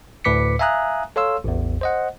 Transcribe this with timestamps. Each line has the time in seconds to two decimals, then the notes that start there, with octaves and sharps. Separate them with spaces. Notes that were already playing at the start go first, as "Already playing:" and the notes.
0.24 D2 A2 B4 D6 B6 C#7
0.59 E5 F5 G#5 A#5 D#6 F#6
1.16 A4 C#5 F5 C6 E6
1.44 A1 E2
1.81 C5 D#5 F#5